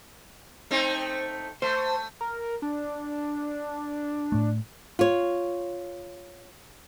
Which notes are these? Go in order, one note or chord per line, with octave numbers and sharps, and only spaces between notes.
A3 C4 D#4
A3 C5
A#4
D4
A2 A3
F4 C#5